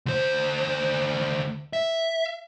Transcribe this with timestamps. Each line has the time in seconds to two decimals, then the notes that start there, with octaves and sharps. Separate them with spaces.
0.06 D2 C5
1.73 E5